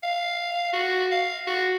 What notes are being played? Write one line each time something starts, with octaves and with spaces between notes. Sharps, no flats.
F5
F#4
F5
F#4